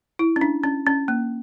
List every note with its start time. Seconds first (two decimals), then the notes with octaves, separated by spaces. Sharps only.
0.19 E4
0.36 C#4
0.41 D4
0.63 C#4
0.86 C#4
1.08 A#3